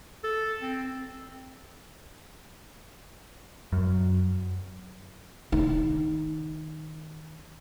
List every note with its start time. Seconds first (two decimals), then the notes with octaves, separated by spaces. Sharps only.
0.24 A4
0.62 C4
3.73 F#2
5.52 D#3 D#4